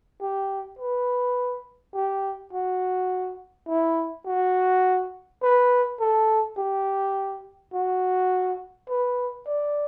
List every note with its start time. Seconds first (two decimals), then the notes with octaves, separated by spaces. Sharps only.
0.21 G4
0.79 B4
1.94 G4
2.53 F#4
3.68 E4
4.26 F#4
5.42 B4
6.00 A4
6.57 G4
7.74 F#4
8.89 B4
9.47 D5